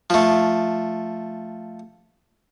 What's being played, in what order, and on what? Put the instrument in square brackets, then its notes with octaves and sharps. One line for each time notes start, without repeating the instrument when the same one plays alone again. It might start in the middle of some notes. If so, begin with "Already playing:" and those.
[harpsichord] F3 A3